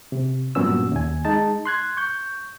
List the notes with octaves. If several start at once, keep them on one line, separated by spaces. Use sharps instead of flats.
C3
G2 A#2 F#3 B3 C#4 E6
D#2 G#5
G#3 D#4 A5
C6 F#6 G#6
C#6 G6